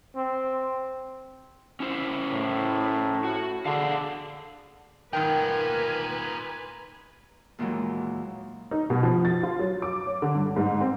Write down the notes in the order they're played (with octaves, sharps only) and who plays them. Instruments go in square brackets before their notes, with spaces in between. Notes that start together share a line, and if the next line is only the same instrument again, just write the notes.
[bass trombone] C4
[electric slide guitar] C#4 E4 C5
[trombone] A2
[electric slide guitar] F#4
[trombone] D3 [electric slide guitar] D4 G#4 F5
[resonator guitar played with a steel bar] G#2 D#3 G5 [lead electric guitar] D#4 F4 [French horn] A#4 [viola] B4 G#5
[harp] D#2 A#2 E3 F#3 G#3
[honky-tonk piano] D#4
B2
F3
A6
F4
F#3
D6
C#5
D3
G2
G#2
C4